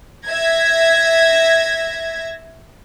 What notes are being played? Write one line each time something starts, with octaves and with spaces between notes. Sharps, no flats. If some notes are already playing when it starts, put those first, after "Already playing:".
E5 G#6 A#6